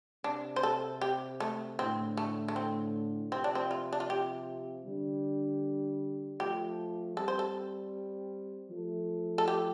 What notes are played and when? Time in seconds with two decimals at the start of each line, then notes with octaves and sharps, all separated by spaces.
0.24 C3 D4
0.56 C5
0.63 A4
1.01 G4
1.40 A3
1.78 A2 D3 C4
2.17 A3
2.48 A3
2.56 C4
3.32 C3 F3 C4
3.44 D4
3.55 C4
3.71 F4
3.93 D4
4.00 F4
4.10 G4
4.86 D3 G3
6.40 F3 A3 G4
7.17 G3 C4 A4
7.28 C5
7.39 A4
8.71 F3 A3
9.38 A4
9.48 G4